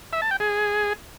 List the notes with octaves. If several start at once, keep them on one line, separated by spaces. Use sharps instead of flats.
E5
A5
G5
G#4